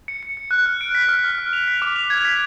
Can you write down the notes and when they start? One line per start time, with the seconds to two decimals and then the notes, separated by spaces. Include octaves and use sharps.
0.08 C#7
0.23 C#7
0.37 C#7
0.51 F#6
0.66 F6
0.81 D7
0.95 B6
1.09 F6
1.24 F6
1.38 F6
1.53 F7
1.68 B6
1.82 D6
1.96 F7
2.10 G#6
2.25 B6